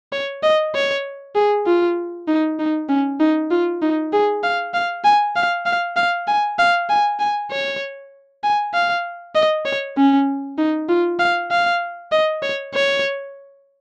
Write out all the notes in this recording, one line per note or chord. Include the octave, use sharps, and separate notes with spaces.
C#5
D#5
C#5
G#4
F4
D#4
D#4
C#4
D#4
F4
D#4
G#4
F5
F5
G#5
F5
F5
F5
G#5
F5
G#5
G#5
C#5
G#5
F5
D#5
C#5
C#4
D#4
F4
F5
F5
D#5
C#5
C#5